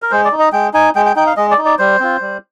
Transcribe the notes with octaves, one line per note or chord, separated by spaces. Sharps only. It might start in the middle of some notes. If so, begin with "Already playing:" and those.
A#4
G#3 C5
D5
D#4
D#5
G#3 G5
D#4 G#5
G#3 G5
G5
D#4 G5
F5
G#3 D#5
D5
D#4
D5
G3 C5
C4 F4
G3